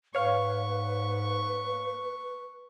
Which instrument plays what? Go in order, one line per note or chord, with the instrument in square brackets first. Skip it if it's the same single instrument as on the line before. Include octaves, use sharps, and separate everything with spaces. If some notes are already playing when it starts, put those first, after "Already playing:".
[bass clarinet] G#2 [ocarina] B4 [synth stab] C#5 F5 [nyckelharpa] C#6